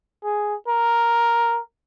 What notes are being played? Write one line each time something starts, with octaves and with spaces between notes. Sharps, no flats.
G#4
A#4